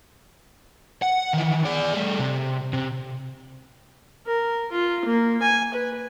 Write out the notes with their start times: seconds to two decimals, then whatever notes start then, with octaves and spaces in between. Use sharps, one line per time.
1.02 F#5
1.33 D#3 E3
1.65 G#4 D5
1.94 G3 A3
2.19 C3
2.73 C3
4.26 A#4
4.72 F4
5.05 A#3
5.42 G#5
5.74 B4